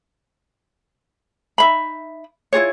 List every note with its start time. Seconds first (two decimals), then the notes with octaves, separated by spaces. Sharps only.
1.58 D#4 E5 B5
2.53 E4 F4 G#4 C#5